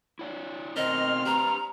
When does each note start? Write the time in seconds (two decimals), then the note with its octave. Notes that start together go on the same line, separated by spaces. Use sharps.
0.19 E4 C#5 D5
0.77 B2 D#3 C4 A#4 D#5 C6 F6
1.26 G4 B4 A#5